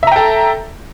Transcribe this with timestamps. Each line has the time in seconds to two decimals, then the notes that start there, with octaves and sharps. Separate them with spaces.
0.03 E5
0.07 A#5
0.12 G5
0.16 A4